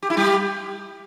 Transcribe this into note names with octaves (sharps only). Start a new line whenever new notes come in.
G4
E4
G3 G4